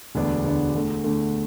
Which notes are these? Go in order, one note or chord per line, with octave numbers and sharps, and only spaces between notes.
E1 D2 D3 B3 D4
E1 D2 D3 B3 D4
D2 D3 A3
D2 D3 A3